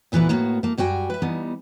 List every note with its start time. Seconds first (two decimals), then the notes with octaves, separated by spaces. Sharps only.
0.12 D2 A#2 E3 B3 E4 B4
0.29 A2 A#3 B3 F#4
0.63 A3 A#3
0.78 F#2 G3 F#4 G5 G#5
1.10 B4 E5
1.22 E3 G3 B3 D#4